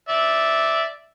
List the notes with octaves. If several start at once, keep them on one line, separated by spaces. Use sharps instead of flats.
D5 E5